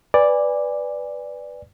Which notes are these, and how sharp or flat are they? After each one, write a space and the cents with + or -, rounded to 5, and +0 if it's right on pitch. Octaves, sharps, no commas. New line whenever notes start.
B4 +0 D5 +0 G#5 -25